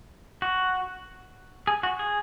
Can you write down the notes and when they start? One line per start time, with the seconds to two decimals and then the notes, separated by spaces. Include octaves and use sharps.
0.42 F#4
1.67 G#4
1.83 F#4
1.99 G#4